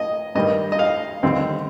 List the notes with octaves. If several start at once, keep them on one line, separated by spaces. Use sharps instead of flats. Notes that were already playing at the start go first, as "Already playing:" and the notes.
Already playing: D#5
G2 D#3 G3 D#5
D#5
F5
D#2 D3 G3 C4